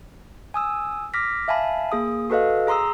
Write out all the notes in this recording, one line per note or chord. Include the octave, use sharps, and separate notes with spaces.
G#5 D#6 E6
D6 F6 A#6 B6
E5 F5 G#5 A5 B5
A#3 G#4 D#6
F#4 A4 B4 D#5 F5
G#4 A#5 C6 D#6 E6